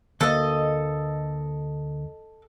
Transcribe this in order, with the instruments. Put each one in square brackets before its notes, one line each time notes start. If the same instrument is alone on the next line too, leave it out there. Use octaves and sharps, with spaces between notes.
[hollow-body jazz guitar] D2 A#3 [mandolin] A4 D#5